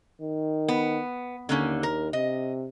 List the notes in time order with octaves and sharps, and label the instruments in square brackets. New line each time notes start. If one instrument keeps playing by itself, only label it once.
[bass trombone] D#3
[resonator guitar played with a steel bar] B3
[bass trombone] D#2 [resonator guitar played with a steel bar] D3 A#3 C#4
[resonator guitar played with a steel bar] A#4
[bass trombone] C3 [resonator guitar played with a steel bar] D#5